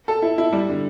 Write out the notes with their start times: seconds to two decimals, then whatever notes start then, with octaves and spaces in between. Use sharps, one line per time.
0.08 A4
0.22 E4
0.38 E4
0.53 G3
0.69 D3